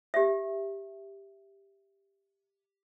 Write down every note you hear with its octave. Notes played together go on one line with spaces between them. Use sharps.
G4 E5